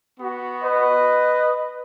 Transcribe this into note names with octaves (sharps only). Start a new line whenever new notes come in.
B3 F#4
B4 D#5